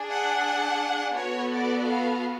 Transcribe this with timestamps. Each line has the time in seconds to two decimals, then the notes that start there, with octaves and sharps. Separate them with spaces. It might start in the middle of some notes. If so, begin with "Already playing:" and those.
Already playing: D4 G#4
0.09 F#5
1.16 B3 F#4 A4 C#5
1.52 D5
1.88 F5